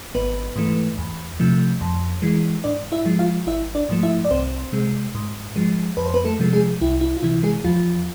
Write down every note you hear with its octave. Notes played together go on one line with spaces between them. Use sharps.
G#1 B3 B4
G#2 E3 A3
E2
C3 F3 A3
F2
E3 G#3
G#2 D4 D5
E4 E5
F3 G#3
F4 F5
G#1 E4 E5
D4 D5
G#2 F3 A3
E4 E5
D5
C2 C4 C5
C3 G#3
G#2
F3 G#3
F2 B4
C5
B3 B4
A3 A4
C3 F3 G#3
G#3 G#4
C2 E4
E4
F4
C3 E3 E4
G#3 G#4
E2 F3 F4